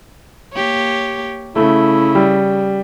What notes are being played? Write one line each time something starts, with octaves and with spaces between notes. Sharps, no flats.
A#3 G4 C#5
C#3 A3 E4
G3